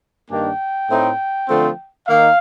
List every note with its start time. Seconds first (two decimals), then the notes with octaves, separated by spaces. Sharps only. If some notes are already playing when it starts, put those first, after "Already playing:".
0.29 G2 D#3 A#3 D4 G5
0.89 A2 A3 C4 D#4
1.47 D3 F3 A3 C4
2.06 D#3 A#3 D#4 F5